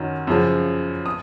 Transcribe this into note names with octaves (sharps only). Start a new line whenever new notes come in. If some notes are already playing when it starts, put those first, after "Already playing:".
Already playing: F#2 D#3 F#3
F#2 C#3 F3
D#6